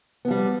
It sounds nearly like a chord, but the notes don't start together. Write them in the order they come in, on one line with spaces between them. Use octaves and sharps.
B3 F3 G3